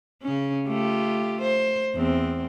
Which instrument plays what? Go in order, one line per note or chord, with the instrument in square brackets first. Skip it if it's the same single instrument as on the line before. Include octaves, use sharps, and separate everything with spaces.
[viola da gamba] C#3 C#4
A3 F4 G4
C5
E2 C4